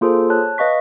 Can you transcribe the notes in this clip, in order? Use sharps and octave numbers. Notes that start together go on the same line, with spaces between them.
A#3 F4 G#4 A4 C5
C#5 A5 F#6
B4 D#5 F5 C#6 B6